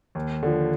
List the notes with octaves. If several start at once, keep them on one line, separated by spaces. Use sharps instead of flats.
D#2
D3 F3